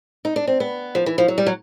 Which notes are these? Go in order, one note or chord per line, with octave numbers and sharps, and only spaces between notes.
D#4
D4
C4
B3
F3
E3
F3
F#3
G3
F#3